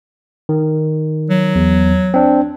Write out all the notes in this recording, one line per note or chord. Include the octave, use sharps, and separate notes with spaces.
D#3
F#3
E2
C4 D4